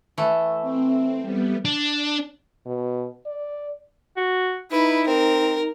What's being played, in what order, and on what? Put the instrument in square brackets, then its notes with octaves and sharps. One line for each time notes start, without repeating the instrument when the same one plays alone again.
[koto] E3 A3
[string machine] C4
G3 B3
[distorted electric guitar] D4
[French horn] B2
D5
[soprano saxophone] F#4
[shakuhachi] D#4 [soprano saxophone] E4 [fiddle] B4
[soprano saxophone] C4 [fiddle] A#4